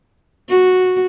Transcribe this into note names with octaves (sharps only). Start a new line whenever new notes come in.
F#4